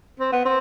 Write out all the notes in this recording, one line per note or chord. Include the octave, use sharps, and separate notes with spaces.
C4
B3
C4